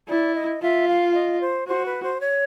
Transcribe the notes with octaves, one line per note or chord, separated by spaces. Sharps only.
E4 D5
D#5
F4 E5
F5
D#5
C5
F#4 C5
B4
C5
C#5